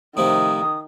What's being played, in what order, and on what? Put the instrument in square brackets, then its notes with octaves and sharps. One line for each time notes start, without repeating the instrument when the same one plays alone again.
[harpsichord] A2 C3 F3 [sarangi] D#3 [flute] D#6